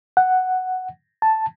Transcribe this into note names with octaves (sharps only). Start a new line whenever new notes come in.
F#5
A5